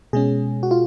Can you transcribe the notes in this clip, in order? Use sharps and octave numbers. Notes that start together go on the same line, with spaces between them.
B2 G#3 C#4 G#4
F#4
F4